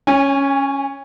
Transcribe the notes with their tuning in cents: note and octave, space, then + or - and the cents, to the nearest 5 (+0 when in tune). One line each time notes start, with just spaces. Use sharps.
C#4 +0 G#5 -35